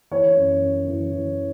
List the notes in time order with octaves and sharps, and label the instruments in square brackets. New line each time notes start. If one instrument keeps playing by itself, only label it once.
[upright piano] E3 C#5
F#2
F#2
E3
E3